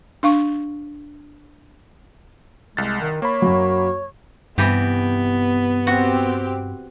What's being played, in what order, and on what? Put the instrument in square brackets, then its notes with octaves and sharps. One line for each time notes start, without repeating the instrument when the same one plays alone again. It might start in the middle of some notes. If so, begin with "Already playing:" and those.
[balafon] D4 F5 C#6
[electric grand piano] C2 A6 [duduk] G#3
[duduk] D#3
[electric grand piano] A#3 B5 [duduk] C#5
[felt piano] F#2 F#3
[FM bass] G2 [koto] C3 E3 G4 [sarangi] B3
[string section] C4 G4 [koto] F#4